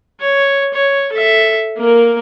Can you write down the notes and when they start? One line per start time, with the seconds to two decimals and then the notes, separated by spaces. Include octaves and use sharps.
0.20 C#5
0.74 C#5
1.13 A4 E5
1.78 A#3 A#4